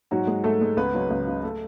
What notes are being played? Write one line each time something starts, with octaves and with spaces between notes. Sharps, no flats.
G#2 F#3 F#4
G#3
G#2 A3 A4
G#3
C#2 B3 B4
C#3 F#3
C#2
C#3 F#3
A3 A4